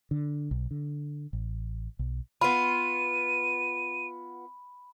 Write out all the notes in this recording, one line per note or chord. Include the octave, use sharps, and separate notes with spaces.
D3
B1
D3
A1
B1
B3 F4 B5 D#7